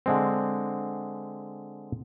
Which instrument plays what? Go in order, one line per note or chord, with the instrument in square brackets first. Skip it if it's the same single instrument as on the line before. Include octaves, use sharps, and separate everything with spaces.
[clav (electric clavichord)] D3 G#3 C4